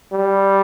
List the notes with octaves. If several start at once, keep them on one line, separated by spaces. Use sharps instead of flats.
G3